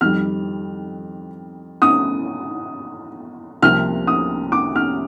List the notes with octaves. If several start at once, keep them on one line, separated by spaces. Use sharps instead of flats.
F2 D#3 G3 F6
D#6
C2 C3 F3 A#3 F6
D#6
D6
F6